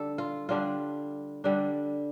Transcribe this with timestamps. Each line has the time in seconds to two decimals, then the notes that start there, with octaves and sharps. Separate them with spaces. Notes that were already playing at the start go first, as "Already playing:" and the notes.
Already playing: D3 G3 D4 A4
0.18 F4
0.49 D3 G3 D4 F4
1.44 D3 G3 D4